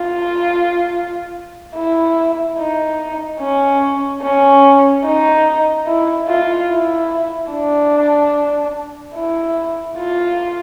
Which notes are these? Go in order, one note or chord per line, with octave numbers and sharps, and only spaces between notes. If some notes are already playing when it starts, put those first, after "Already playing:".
Already playing: F4
E4
D#4
C#4
C#4
D#4
E4
F4
E4
D4
E4
F4